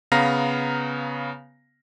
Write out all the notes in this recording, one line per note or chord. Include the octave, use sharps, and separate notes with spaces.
C#3 B3 F5 A#5 A#6